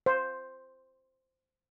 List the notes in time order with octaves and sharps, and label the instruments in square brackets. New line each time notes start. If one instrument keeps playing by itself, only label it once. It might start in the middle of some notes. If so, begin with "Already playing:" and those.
[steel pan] C5